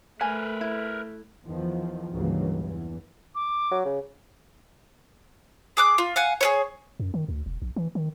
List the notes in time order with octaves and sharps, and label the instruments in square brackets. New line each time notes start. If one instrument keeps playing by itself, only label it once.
[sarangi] A3 [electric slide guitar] A#4 B4 [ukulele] G#5
[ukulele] E4
[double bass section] E2 D#3 F3
C#2 G2 C#3 E3 F#3 A#3
E2 E3
[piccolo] D6
[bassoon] F#3
C#3
[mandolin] G#4 D6 F#6
F4
F5 F#5 G#5
G#4 B4 C#5
[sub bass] F#2
D#3
D2
E1
A#1
E3
D#3